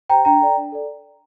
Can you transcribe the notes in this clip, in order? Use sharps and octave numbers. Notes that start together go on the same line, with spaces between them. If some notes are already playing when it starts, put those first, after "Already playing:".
G4 C5 G5 A#5
D4 G5 A#5
A4 D5
D4
A4 D5